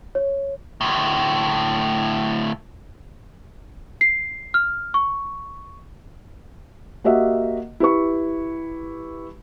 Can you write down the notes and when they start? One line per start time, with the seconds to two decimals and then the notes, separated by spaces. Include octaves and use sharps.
0.15 C#5
0.81 D2 A2
4.01 C7
4.54 F6
4.94 C#6
7.04 A#3 F#4 G4 D#5 E5 F#5
7.80 E4 G4 B4 C#6